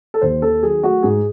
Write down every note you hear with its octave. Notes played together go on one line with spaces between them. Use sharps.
A4
D#2 C5
D#3 A4
F#3 G#4
A3 F#4
G#2 G#4